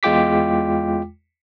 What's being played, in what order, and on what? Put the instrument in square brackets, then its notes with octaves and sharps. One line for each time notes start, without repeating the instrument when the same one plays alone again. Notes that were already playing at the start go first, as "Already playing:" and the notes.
[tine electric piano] E2 G#3 F4 G5 D6 B6